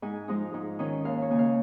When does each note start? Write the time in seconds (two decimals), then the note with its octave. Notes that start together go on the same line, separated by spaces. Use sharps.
0.02 G#2 G#5
0.28 F3 G#3 D#4
0.54 G#2
0.79 D#3 C#4
1.04 D#2 F5
1.22 C#5
1.30 C#3 A#3 G#5
1.39 F5